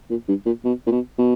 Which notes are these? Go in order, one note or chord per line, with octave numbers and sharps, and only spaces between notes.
A#2
G2
A#2
B2
A#2
B2
B2